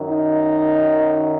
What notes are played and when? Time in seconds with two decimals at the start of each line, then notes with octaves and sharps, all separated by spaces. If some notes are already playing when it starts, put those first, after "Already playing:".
Already playing: F#2 D#3
0.09 D#4